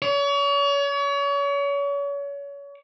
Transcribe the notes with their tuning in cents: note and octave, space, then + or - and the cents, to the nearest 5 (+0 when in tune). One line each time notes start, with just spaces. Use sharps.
C#5 +35